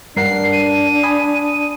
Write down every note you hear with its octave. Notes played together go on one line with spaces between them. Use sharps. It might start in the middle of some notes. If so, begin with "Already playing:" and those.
G2 D4 A#4 F#5 C7
D#7
G#5 B5 D#6